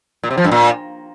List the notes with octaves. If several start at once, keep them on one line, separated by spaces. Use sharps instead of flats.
A#2
C3
F3
G2
A#2